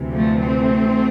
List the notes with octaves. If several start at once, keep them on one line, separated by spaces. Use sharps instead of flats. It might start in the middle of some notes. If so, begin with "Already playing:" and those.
Already playing: D2 C3 E3
F3 A3
A3 C4